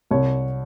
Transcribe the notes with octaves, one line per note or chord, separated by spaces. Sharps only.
C2 C#5